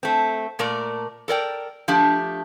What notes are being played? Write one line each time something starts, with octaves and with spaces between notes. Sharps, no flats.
A3 C4
A#2 A3 A#4 D5
A4 A#4 D5 G5
F3 A3 D4 G4